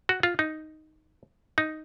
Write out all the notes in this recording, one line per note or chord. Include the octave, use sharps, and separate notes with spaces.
F#4
F4
D#4
D#4